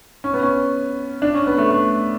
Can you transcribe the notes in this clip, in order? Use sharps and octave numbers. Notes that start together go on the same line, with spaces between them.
C#4
B3
C#4
D4
C#4
B3
A3
A3